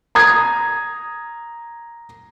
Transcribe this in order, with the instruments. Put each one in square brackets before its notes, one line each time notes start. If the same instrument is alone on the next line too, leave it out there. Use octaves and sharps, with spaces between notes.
[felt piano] A#5 D#6 G#6